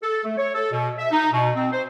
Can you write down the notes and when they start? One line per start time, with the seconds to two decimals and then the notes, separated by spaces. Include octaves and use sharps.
0.03 A4
0.25 A3
0.38 C#5
0.54 A4
0.72 B2
0.98 E5
1.12 D#4
1.33 B2
1.56 C4
1.73 C5